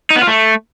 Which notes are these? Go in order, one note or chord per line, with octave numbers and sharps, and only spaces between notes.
D#4
B3
F4
A3